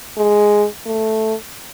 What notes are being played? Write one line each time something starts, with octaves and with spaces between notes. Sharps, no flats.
G#3
A3